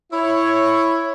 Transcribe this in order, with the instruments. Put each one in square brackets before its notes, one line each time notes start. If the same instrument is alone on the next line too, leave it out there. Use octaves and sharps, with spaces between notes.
[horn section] E4 C#5